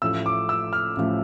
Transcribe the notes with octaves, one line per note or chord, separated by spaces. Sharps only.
A1 A2 F3 A3 E6
D6
E6
F6
A1 A2 F3 A3